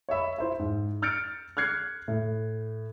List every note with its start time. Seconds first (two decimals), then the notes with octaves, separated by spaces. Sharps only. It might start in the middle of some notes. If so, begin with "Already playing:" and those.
0.09 C#5 D#5 E5 B5
0.38 E4 C5 E5
0.59 G#2
1.02 E6 F6 G6 A6 C#7 D7
1.57 F6 F#6 G#6 C7 C#7
2.08 A2